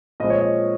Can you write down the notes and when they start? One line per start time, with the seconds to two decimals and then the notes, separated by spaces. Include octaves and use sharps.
0.20 A#2 F3 G#3 C4 D#5
0.30 C#5
0.41 D#5